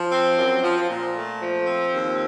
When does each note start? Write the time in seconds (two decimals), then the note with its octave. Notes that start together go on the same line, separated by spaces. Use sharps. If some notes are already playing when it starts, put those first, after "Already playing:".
Already playing: F3
0.11 C4
0.37 F#2
0.63 F3
0.89 A#2
1.14 A3
1.41 F3
1.66 C4
1.93 D#2